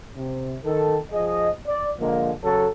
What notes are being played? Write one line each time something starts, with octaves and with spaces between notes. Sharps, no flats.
C3
D#3 A4
F3 G#4 D#5
D5
D3 F3 G#3 A#3
C#3 F#3 A4